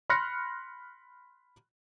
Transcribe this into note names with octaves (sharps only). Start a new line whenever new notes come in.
B5 C6 F6 F#6 A#6 C#7